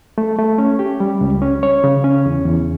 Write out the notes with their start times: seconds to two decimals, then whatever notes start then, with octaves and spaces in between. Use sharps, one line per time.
0.18 A3
0.39 A3
0.58 C#4
0.79 G4
1.00 G3
1.21 C#2
1.42 C#4
1.63 C#5
1.84 C#3
2.04 C#4
2.26 E2
2.45 E2